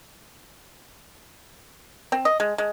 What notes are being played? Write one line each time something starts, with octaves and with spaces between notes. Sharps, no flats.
C4
D#5
G#3
G#3